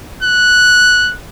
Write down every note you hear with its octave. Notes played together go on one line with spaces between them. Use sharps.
F#6